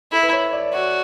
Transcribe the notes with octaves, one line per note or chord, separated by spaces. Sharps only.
E4 A4
B4
C#5
D5
F#4 C#5